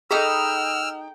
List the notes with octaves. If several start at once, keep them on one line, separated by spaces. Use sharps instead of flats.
D#4 G#4 A4 G5 A#5 B5 E6 F6